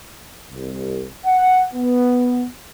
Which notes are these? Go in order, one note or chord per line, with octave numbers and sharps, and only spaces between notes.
C2
F#5
B3